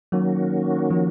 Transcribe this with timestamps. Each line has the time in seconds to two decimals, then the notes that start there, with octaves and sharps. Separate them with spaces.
0.12 D#3 F#3 A#3 C#4 F#4
0.90 F3